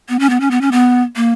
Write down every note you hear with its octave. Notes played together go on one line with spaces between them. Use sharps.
B3
C#4
B3
C#4
B3
C#4
B3
A#3